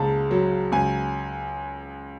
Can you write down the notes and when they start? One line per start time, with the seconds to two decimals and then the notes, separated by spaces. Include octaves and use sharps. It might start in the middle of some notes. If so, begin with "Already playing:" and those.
Already playing: C#2 C#3 A5 A#5
0.31 F#3
0.72 C#2 G#5